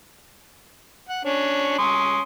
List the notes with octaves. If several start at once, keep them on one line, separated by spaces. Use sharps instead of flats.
F#5
C#4 D4 C#5
C#4 C6 D#6